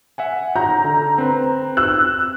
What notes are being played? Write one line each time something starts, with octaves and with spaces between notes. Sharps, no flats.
E5 F#5 G#5
A#5 G6
D3
C4 B4
E6 F#6